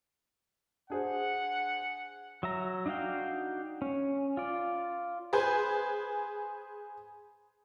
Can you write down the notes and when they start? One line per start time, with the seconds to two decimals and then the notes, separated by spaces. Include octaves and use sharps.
0.90 D4 G#4 C5 F#5
2.43 F#3 E5 A#5
2.86 D4 D#4 F#4 F5 G5
3.82 C#4
4.37 F4 D5
5.33 G#4 B4 C5 G#5